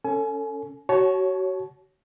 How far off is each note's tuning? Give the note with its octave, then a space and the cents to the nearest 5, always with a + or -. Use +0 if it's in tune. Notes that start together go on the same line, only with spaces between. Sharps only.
C#4 +0 A4 +20 G#5 +30
F#4 +35 C#5 +0 A5 -25